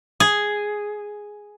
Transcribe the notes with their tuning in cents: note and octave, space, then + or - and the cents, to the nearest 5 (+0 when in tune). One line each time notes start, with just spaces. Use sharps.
G#4 +0